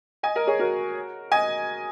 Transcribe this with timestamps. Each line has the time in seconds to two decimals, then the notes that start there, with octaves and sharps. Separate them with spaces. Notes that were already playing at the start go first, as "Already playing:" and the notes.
0.23 D#5 G#5
0.35 A#4 D#5
0.47 G#4 C#5
0.60 F#4 A#4
1.32 D#5 G#5